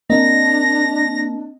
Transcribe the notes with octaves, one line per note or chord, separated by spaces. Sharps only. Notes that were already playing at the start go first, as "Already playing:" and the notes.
A#3 C4 D4 D#5 A#6